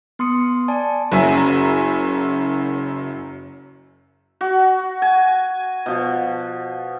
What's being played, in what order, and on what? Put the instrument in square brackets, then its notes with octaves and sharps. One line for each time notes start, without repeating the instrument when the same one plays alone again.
[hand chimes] B3 C6 D#6 C#7
D5 G#5 A5
[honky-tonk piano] F#1 F#2 F#3 E5 G#5
[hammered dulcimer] F#4
G#5
B2 F3